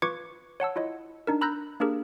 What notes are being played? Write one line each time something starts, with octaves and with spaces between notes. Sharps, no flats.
F4 B4 C#6 D6 G#6 C#7
C#5 F#5 A5 E6
E4 F4 C#5 D#5
D4 D#4 A#4
A#5 B5 E6 F#6 G6 A#6
A#3 D4 G4 G#4 A#4